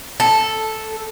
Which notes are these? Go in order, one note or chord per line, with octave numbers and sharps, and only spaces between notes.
A4